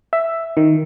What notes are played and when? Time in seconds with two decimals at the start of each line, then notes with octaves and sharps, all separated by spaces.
0.13 E5
0.57 D#3